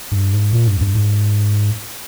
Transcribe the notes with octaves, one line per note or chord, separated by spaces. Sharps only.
G2
G#2
A#2
G2
E2
G2
G#2